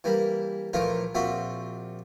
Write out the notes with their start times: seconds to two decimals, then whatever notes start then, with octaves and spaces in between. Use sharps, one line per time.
0.04 E3 G3 A#3
0.73 A#1 E3 F3 A3 F4 A#4
1.15 A#1 C4 F4 F#4 E5